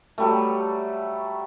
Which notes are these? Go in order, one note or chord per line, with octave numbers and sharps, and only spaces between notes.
F#3 G3 A3